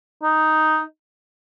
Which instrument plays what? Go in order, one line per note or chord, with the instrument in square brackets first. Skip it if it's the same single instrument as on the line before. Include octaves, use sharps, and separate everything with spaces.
[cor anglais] D#4